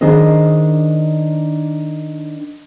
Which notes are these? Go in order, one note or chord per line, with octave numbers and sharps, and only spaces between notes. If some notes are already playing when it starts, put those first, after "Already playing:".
D#3 D4 G#4 C5 D#5